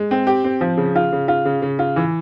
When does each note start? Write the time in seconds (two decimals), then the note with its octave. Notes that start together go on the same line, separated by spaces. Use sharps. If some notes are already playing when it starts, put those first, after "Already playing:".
Already playing: G#3
0.11 C4
0.27 G4
0.44 C4
0.61 F3
0.77 C#3
0.96 F4
1.12 C#3
1.28 F4
1.45 C#3
1.62 C#3
1.79 F4
1.96 E3